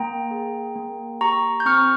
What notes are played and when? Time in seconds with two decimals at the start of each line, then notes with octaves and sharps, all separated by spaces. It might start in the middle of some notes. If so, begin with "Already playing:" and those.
Already playing: A#3 G5 A#5
0.31 G#4
0.75 A#3
1.21 G4 A#5 C#6
1.60 G6
1.66 C4 C#6 F6